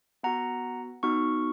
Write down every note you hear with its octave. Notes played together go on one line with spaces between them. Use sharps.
B3 F#4 F#5 A#5
B3 D#4 F#4 C#6 F6